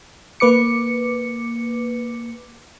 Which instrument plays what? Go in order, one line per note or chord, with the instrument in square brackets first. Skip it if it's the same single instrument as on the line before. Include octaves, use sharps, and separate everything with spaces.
[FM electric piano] A#3 B4 D6 C#7